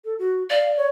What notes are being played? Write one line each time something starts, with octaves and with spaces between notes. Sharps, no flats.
A4
F#4
D5 F5
C#5